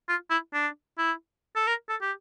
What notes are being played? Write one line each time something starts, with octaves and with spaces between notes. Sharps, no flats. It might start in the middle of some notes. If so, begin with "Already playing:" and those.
F4
E4
D4
E4
A4
A#4
A4
G4